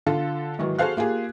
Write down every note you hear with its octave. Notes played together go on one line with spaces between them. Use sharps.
D3 F4 A4
G#2 D#3 E3 F#3
F#4 G#4 A4 C5 F5 F#6
A#3 F4 G4 G#4